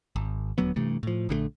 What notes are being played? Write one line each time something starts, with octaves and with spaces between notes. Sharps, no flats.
G#1
D#1 D2 F#3 B3
G2 C3 E3 A3
A2 F3
A#1 D3 F#3 A3